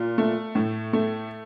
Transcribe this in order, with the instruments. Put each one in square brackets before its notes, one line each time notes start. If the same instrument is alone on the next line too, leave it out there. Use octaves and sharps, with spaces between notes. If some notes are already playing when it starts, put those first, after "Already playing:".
Already playing: [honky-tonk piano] A#2
A3
A2
A3